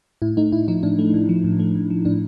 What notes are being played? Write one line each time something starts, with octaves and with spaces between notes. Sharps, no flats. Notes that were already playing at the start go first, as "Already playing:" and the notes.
A2 E4
A3 D#4
A2 E4
F3 D#4
A2 D4
A3
A2
F3
A2
A3
A2
F3
A2 D4